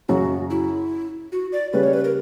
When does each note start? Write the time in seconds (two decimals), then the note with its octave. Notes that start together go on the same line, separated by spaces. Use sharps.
0.08 F#2 C#3 F#3 F#4
0.50 E4
1.32 F#4
1.52 D5
1.73 C#3 G3 C#4 B4
1.83 C#5
1.93 B4
2.04 A#4